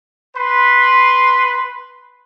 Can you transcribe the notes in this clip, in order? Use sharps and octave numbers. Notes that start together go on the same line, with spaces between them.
B4 C6